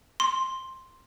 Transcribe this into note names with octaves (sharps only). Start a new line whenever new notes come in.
C6